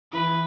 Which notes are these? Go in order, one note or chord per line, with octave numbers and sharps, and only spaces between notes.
E3 B4